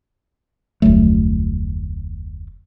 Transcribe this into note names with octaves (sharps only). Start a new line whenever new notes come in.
F1 D2 F#3 A3